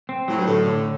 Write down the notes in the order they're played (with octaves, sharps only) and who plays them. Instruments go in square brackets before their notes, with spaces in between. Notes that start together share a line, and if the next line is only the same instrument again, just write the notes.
[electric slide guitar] C4
[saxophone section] A2 [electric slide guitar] F#3
[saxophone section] G2
[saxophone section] A2 [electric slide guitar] D3
[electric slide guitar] D3